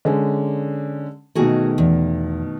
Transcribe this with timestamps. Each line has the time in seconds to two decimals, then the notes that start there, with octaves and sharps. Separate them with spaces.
0.05 D3 G#3 C#4
1.35 B2 D#3 A3 F#4 G#4 A#4
1.78 E2